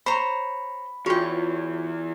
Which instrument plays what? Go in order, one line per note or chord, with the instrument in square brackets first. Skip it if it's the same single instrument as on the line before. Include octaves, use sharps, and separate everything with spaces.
[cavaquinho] C5 C#5 A#5 [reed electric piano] B5
[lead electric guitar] E2 [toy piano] F4 F#4 [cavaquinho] C#5 G5